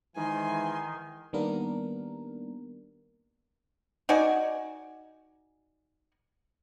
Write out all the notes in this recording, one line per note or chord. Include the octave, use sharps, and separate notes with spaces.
G#2 D#3 E3 G#5 C6
D#3 G3 A#3 B3 D4 A#4
D#4 F#4 D5 G#5